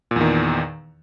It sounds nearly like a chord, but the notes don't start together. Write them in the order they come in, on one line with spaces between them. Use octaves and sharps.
A#2 E2 D#3